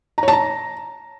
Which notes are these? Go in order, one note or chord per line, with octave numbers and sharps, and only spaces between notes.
A#5
C#5
A5
A#5